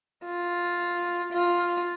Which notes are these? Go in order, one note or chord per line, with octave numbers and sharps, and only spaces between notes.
F4
F4